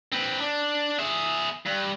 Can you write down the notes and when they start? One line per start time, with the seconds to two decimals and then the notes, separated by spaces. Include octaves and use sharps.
0.12 C4 B4
0.40 D4
0.99 G#4 E5
1.66 G2